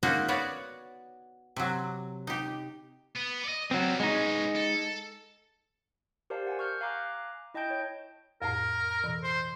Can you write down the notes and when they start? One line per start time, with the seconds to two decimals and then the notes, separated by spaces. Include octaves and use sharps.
0.03 G#3 A#3 C#4 D#4 F#4
0.28 B3 F#4 C#5 D5
1.56 C3 F#3
2.27 D#4 G4
3.15 B3
3.44 D5 D#5
3.71 F#3 G3 B3 C4
4.00 G#3 B3 C#4 D#4
4.55 A4
6.30 G4 A#4 C5 D5 F5 A5
6.47 F#5 G#5 A5
6.59 C#6 F6 G6
6.81 F5 G#5 A#5 D6 F#6
7.54 E4 D#5 G5 A5 G6 D7
7.70 C#5
8.42 F2 A2 A#4
9.04 B2 E3
9.23 C5